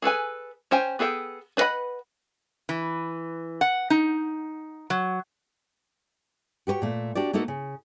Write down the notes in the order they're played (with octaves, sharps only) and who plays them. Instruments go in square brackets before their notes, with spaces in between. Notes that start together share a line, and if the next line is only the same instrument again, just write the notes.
[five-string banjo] G#4 A4 B4 G#5
C#4 C5 G5 G#5
B3 G#4 A4 B4 G5
D4 B4 D#5 F#5 B5
[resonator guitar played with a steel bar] E3
F#5
D#4
F#3
[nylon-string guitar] F#4 G4 B4 C#5
A#2 A3
D4 F#4 G4 D5
A3 A#3 D#4 F#4 A4
C#3